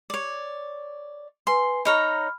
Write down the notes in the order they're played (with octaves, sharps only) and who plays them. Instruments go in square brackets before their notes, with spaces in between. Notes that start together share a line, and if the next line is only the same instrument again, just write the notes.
[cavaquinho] C#5 D5
[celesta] B4 G#5 C7 [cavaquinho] C6
[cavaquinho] D#4 C#5 A#5 [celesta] B5 F6